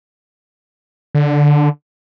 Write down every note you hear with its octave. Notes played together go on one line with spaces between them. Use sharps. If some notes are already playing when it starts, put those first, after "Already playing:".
D3